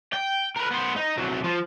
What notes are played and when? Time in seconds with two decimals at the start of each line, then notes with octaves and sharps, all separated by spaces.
0.13 G5
0.57 A#4 B4
0.71 B3 C5
0.96 D#4
1.18 C2 F#3
1.44 F3